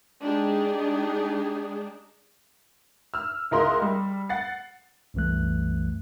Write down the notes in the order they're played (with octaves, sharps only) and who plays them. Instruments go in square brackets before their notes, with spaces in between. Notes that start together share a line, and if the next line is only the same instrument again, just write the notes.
[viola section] G#3 D4 D#4 G4 G#4
[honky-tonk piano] E6 F6
C#2 E4 A#4 D#5 C6
G3
F#5 A6 C7
[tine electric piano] C2 F#2 E3 A3 F#6